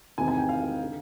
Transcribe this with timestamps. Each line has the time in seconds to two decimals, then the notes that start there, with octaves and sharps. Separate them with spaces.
0.18 E2 C3 D#3 G#5
0.28 G#5
0.38 G5
0.49 F5
0.83 D3